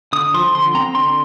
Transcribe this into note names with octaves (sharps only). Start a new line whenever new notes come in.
D3 D#6
F3 C6
D3 C6
C4 A#5
D3 C6